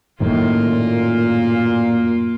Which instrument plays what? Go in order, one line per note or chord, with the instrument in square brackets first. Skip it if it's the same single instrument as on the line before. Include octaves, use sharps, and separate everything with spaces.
[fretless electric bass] F#2 A2 D#3 [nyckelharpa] A#3 F4
[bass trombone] A#2